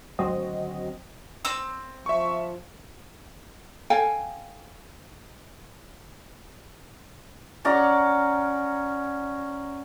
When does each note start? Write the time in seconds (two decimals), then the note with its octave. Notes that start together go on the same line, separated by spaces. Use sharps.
0.19 G#1 D2 F#3 C4 F#4 D#5
1.45 C4 E6
2.06 F3 E5 C#6
3.90 A4 F5 G5 G#5
7.65 C#4 D5 F#5 A#5